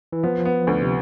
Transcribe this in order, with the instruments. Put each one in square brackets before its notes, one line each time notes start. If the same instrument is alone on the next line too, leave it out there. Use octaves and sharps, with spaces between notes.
[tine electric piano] E3
[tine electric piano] F3 [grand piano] B3
[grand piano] B3
D2
[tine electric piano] C3